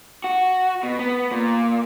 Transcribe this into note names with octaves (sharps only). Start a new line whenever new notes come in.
F#4
B2
B3
A#2